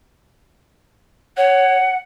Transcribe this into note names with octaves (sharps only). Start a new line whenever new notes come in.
C#5 F#5